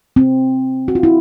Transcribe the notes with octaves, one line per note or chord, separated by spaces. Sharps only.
C4
F#4
F4
E4